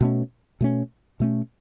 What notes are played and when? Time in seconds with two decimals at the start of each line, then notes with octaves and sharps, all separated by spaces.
0.01 B2 A3 C#4
0.61 B2 A3 C#4
1.20 B2 A3 C#4